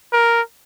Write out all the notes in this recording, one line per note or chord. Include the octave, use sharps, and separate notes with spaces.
A#4